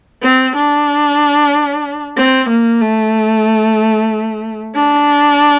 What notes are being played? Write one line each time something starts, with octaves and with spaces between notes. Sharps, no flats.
C4
D4
C4
A#3
A3
D4